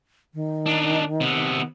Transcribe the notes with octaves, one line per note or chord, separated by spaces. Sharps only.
D#3
D4 D#4
C3 B3